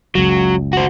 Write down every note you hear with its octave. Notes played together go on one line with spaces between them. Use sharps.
F#1 C#2 F#3
F#4 C5